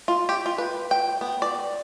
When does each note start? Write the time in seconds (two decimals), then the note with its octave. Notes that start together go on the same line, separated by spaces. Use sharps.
0.08 F4
0.29 G4
0.46 F4
0.58 B4
0.91 G5
1.21 B3
1.42 D5